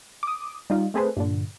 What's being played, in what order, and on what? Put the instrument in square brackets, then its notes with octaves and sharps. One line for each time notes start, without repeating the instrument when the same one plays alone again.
[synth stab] D6 D#6
G3 D#4 F4
A3 C4 G#4 A4 B4 C5
G2 A#2 D3